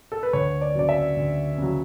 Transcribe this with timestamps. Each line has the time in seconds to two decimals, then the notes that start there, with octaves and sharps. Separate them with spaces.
0.12 A4
0.23 B4
0.33 D2 C#5
0.61 D5
0.75 C#3 F#3 D5
0.89 E5
1.17 D2
1.58 C#3 F#3